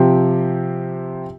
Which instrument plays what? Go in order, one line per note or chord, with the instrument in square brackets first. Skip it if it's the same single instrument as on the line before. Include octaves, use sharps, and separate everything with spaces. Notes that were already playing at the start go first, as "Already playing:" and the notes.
Already playing: [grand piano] C3 F3 C4 G4